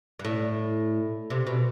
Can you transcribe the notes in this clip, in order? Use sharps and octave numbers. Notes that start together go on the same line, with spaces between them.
G2
A2
C3
B2